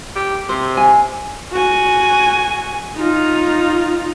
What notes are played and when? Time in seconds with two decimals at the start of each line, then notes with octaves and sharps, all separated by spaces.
0.16 G4
0.49 C3 C5
0.77 G#5
1.52 F#4 G#5
2.97 D#4 F4